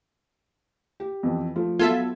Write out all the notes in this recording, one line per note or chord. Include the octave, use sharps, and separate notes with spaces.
G4
F2 E3
F3 A3 F4
F#3 B3 F4 A4 E5 G#6